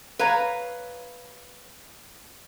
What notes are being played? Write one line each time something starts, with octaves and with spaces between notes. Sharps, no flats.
B4 C#5 F5 A#5